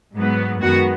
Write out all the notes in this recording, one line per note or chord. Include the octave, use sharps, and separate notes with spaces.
G#2 F#3 B3
F#2 D#3 G#3 B3 F#4